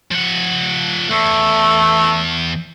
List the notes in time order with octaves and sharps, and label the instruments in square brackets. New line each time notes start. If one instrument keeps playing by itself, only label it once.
[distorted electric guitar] F3 F#5
[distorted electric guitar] E2 [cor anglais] A3